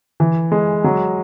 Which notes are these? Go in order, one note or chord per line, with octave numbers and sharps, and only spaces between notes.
E3
G#3
F#3